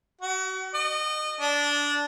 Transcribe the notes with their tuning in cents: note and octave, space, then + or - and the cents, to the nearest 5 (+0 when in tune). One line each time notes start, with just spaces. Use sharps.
F#4 +35
D#5 -30
D4 -15